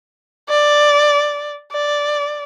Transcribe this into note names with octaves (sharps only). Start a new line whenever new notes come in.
D5
D5